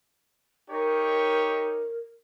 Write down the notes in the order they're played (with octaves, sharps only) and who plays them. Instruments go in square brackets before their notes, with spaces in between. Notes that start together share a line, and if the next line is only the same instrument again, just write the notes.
[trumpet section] D#4 G4 C#5 [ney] A#4